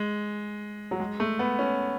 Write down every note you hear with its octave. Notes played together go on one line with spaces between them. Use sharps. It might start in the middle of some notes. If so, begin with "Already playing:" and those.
Already playing: G#3
F#3
G#3
A3
B3
C#4